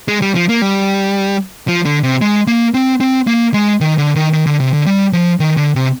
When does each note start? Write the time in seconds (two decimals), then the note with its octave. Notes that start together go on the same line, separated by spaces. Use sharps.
0.08 G#3
0.22 G3
0.35 F3
0.49 A#3
0.62 G3
1.68 F3
1.85 D3
2.03 C3
2.21 G#3
2.47 A#3
2.74 C4
3.01 C4
3.27 A#3
3.54 G#3
3.81 D#3
3.98 D3
4.16 D#3
4.33 D#3
4.46 D3
4.60 C3
4.73 D3
4.86 G3
5.13 F3
5.40 D#3
5.57 D3
5.75 C3